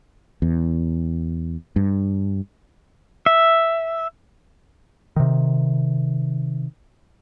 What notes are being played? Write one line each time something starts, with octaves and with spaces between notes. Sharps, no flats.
E2
G2
E5
C3 D#3